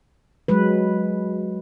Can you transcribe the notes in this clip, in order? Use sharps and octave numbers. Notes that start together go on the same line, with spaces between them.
F#3 G#3 B4